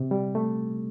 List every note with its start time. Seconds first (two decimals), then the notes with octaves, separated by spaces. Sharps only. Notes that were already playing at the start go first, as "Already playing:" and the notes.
Already playing: C3
0.11 G3
0.35 A3